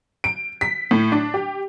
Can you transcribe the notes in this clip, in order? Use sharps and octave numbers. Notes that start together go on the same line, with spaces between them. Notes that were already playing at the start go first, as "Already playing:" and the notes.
D7
B6
A2
D4
G4